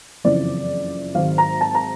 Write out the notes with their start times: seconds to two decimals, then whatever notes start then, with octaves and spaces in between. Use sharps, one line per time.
0.24 F#1 F2 C#3 E3 D5
1.15 G#1 G#2 D#3 F#3 F5
1.38 A#5
1.61 A5
1.75 A#5